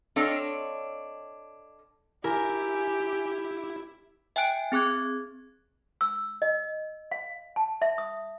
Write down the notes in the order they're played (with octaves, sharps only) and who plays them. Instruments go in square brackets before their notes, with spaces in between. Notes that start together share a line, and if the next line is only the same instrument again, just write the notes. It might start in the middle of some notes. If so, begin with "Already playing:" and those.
[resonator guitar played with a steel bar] C4 D4 A4 C#5 D#5 F5
[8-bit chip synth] E4 [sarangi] G4 [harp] A#4 [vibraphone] G#5
[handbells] E5 G5 G#5 F#6 D7
C4 G#4 D6 F#6 G#6
[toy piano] E6
D#5
F5
A5
E5
D#6